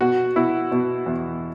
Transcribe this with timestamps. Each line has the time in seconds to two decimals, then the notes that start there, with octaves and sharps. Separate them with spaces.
0.01 B2 F#4
0.36 B2 E4
0.72 B2
1.06 E2